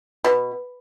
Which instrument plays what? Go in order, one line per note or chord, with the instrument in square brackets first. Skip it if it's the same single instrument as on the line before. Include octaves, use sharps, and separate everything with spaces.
[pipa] B2